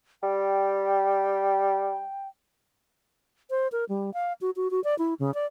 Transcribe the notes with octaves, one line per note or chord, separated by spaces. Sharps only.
G3 G5
C5
A#4
G3
F5
F#4
F#4
F#4
D5
E4
C#3
D5